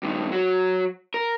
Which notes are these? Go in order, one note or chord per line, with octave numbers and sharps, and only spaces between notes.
G2 D#3
F#3 F#4
A#4